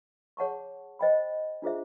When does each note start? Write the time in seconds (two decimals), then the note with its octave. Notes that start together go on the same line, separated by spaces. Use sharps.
0.37 G#4 C#5 F#5 A5 C#6
0.99 C5 D#5 G5 B5
1.62 D4 F4 G#4 C5 E5